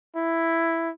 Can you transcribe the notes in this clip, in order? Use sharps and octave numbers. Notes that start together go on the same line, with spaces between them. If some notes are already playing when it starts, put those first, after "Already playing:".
E4